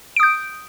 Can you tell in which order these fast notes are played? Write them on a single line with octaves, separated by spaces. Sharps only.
D7 D#6 G6